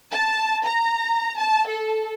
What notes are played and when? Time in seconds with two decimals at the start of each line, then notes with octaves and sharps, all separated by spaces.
0.11 A5
0.64 A#5
1.37 A5
1.67 A4